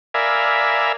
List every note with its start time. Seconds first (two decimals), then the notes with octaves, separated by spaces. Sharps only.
0.14 A#4 D5 E5 F5 G#5 B5